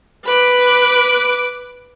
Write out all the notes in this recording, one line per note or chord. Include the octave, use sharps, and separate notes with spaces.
B4 B5 D6